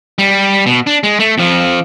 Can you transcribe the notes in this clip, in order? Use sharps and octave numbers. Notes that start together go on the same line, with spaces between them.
G3
B2
D4
G#3
A3
F2 F3